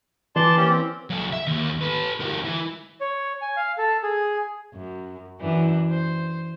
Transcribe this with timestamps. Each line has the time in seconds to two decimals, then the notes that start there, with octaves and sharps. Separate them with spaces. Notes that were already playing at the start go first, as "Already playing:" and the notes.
0.36 E3 D5 A5 C6
0.57 A#3 C#4 G4
0.70 C4
1.10 F#3 A4
1.33 E5
1.47 D#2
1.81 A4 B4
2.20 D2 A#4
2.45 E3
3.01 C#5
3.42 G#5
3.56 F5
3.78 A4
4.03 G#4
4.74 F#2
5.40 F#2 E3 D4
5.91 C5